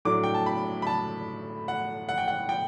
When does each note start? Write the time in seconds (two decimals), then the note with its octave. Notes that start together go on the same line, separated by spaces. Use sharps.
0.05 A2 F#3 A3 D4 D6
0.24 G5
0.35 A5
0.46 B5
0.82 B5
0.87 A5
1.68 F#5
2.09 F#5
2.18 G5
2.28 F#5
2.49 G5